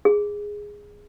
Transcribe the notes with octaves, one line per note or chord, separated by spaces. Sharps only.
G#4